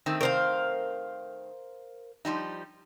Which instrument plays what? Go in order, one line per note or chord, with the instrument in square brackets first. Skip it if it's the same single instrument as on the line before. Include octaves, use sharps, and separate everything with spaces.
[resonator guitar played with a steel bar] D#3 A3 C4
[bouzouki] A#4 C5 F5
[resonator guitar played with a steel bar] F3 G3 D#4